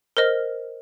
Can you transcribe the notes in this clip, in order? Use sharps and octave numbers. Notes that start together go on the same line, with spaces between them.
A#4 C5 D#5 F6